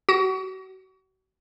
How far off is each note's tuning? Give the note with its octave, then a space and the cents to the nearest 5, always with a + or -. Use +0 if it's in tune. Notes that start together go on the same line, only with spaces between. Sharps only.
F#4 +35